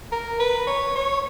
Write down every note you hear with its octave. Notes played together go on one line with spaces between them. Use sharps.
A#4
B4
C#5
C#5